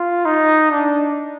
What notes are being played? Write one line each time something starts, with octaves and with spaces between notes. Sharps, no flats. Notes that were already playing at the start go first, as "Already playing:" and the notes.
Already playing: F4
D#4
D4